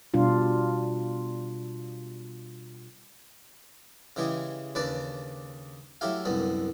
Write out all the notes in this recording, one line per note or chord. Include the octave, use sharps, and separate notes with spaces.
B2 G3 D4 F4
C#3 E3 G#3 G4 G#4
D#2 C#3 D4 B4 D5
F#3 A3 E4 G4 F5
C2 F#2 D3 B3